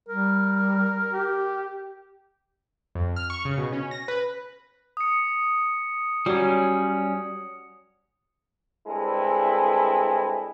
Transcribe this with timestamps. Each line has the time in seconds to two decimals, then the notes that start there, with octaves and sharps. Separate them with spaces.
0.09 G3 A#4
1.13 G4
2.95 F2
3.16 F6
3.30 C#6
3.45 C#3
3.58 B2
3.72 C#4
3.91 A#6
4.08 B4
4.97 D#6 C#7
6.26 F#3 G3 C#4
8.88 G2 G#3 C4 E4 A4